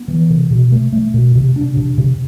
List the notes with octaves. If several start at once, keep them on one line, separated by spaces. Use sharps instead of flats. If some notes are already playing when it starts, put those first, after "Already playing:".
Already playing: B3
E3
C3
B2
A3
A3
B2
C3
D4
C3
C3